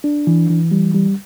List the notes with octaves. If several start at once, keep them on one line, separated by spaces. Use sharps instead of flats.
D4
E3
E3
G3
G3